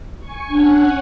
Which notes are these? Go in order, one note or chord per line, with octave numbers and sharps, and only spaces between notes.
G#5 C#6
C#4 D4 F#5